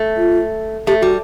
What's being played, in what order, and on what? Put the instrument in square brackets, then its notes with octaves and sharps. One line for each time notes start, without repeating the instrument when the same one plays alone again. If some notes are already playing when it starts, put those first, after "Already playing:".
Already playing: [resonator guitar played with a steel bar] A3
[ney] F4
[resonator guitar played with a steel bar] A3 [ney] G4
[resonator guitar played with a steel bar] G3 [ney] F#4